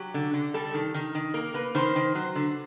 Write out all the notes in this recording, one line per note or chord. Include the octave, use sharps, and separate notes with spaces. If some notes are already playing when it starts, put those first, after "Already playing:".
Already playing: F#3 G4
D3
D3
G3 A4
D#3
D#3
D#3
A#3 A#4
A#3 B4
D#3 C5
D#3
F#3 C5
D3